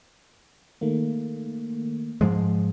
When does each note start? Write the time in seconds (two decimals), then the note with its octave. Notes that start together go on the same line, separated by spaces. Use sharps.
0.81 D#3 A3 A#3
2.21 G#2 F3 G#3